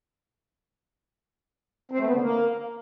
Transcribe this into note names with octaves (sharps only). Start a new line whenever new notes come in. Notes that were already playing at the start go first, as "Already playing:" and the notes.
C4
A3
B3
D3
A#3